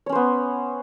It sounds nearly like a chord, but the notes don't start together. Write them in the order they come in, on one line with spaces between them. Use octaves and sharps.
C#5 C#4 C5 B3